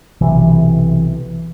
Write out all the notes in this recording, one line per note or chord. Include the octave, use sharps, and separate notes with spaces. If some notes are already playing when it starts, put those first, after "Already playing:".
B1 C3 E3